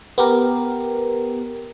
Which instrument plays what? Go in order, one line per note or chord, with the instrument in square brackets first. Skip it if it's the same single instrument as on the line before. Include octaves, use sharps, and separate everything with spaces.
[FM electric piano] B3 G4 A#4